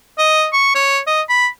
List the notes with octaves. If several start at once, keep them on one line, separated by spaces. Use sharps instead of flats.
D#5
C#6
C#5
D#5
B5